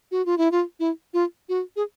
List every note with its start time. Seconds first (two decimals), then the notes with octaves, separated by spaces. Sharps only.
0.11 F#4
0.26 F4
0.38 E4
0.52 F4
0.80 E4
1.14 F4
1.49 F#4
1.76 G#4